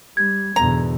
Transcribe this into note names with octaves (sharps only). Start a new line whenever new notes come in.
G3 G#6
E2 G#2 B2 D3 A#5